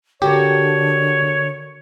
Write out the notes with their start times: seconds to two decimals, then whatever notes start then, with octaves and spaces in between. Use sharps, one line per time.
0.22 D3 F#4 G4 A4 A#4 C#5